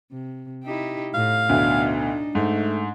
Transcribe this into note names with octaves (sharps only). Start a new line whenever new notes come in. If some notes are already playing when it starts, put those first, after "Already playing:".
C3
D#4 E4 G4
A2 F5
D2 B2 D4 D#4
G#2 A3